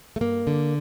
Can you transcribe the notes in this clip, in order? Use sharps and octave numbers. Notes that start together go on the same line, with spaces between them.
A3
G2 A#3
D3